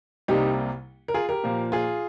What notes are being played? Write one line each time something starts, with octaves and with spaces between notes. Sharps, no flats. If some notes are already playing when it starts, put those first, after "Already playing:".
C2 C3 G3 A#3 D#4 G4
A#4
F4 G#4
G4 A#4
A#2 F3 A#3
F4 G#4